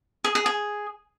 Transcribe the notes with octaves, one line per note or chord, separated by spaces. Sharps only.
G#4
G#4
G#4